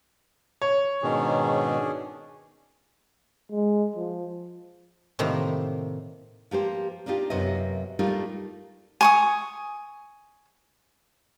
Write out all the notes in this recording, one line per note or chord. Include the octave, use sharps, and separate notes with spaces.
C#5
G#2 B2 D#3 C#4 D4 G#4
G#3
F3
A2 C3 D#3 A#3
F3 A#3 G4 C5
A#3 D4 D#4 F4 G4
F#2 C3 A#3 B3 D#5
G3 A3 A#3 D#4 F4 A#4
G#5 C#6 D#6